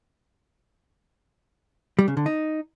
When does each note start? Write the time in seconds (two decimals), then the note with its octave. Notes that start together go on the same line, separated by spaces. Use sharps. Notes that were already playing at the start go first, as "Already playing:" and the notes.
1.99 G3
2.08 C#3
2.17 D3
2.26 D#4